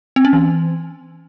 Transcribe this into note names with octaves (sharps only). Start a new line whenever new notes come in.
C4
C#4
E3